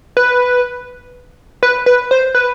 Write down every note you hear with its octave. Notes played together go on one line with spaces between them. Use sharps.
B4
B4
B4
C5
B4